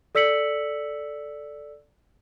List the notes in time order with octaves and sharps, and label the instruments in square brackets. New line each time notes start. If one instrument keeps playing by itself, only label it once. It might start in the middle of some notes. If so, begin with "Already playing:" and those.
[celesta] A4 D5 E6 B6 C#7 F#7